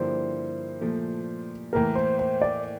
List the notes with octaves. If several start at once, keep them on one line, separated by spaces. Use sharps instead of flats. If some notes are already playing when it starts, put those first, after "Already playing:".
Already playing: G2 D3 F3 A#3 E4 C5
A#2 F3 A3
A2 E3 A#3 A#4
C5
C5
D5